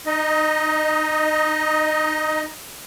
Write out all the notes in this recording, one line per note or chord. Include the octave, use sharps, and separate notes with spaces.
D#4 D#5